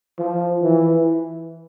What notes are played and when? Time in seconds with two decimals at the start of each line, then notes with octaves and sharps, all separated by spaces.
0.19 F3
0.63 E3